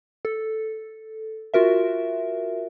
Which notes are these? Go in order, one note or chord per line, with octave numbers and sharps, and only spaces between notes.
A4
F4 F#4 A#4 E5